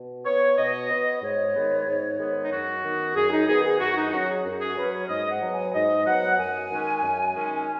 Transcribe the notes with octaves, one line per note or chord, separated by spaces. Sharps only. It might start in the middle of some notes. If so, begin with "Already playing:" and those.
Already playing: B2
B3 C#5
B2 D#5
B3
G#2 C#5
D#3 G#3 B3
G#2
D#3 G#3 B3
D#4
F#2 F#4
D#3 B3
F#2 G#4
D#4
D#3 B3 G#4
G#4
F#2 F#4
D#4
F#3 C#4 F#4
G#4
F#2
G#4
F#3 C#4 B4
C#5
G#2 D#5
F#5
F#3 B3
G#5
G#2 D#5
F#3 B3 F#5
F#2 G#5
D#3 G#3 C#4
F#2
D#3 G#3 C#4